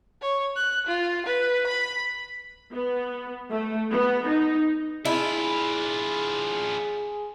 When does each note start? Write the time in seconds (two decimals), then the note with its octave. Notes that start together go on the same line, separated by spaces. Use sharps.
0.22 C#5
0.56 F#6
0.87 F4
1.26 B4
1.67 B5
2.72 B3
3.51 A3
3.91 B3
4.26 D#4
5.05 D4 E4 F4 G#4